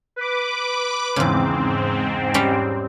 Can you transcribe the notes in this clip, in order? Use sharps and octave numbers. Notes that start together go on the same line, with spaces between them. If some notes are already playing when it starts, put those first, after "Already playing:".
B4 D6
E2 G#2 C#3 C4
G3 C#4 G4